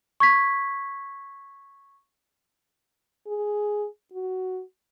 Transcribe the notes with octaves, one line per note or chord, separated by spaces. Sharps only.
C#6 G#6 B6
G#4
F#4